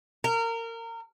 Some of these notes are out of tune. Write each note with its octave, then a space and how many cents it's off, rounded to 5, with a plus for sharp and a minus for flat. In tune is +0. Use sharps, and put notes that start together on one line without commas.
A#4 -25